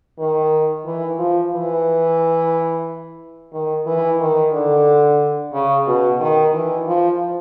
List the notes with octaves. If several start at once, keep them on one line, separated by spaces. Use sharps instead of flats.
D#3
E3
F3
E3
D#3
E3
D#3
D3
C#3
B2
D#3
E3
F3